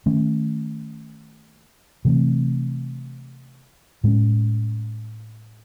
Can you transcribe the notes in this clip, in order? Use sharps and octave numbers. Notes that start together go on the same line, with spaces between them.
D#3 A3 C#4
C3 E3 A3 C4
A2 G#3 C#4